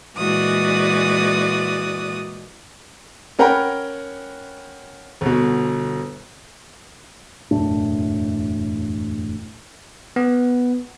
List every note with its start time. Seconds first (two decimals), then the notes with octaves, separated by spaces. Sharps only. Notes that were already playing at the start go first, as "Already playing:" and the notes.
0.17 A#2 E3 G#3 F#4 D5 D#6
3.39 C#4 A#4 F#5 G5 A#5 B5
5.21 G1 B2
7.51 E1 F#2 A2 D4
10.16 B3